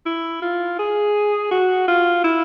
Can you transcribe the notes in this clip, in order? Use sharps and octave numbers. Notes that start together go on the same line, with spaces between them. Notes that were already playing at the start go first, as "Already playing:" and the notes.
E4
F4
G#4
F#4
F4
E4